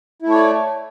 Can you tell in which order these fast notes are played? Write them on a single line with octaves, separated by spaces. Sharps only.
E4 A3 C#5 D5